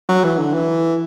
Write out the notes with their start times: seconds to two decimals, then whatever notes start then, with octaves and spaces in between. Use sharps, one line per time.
0.09 F#3
0.24 E3
0.39 D3
0.54 E3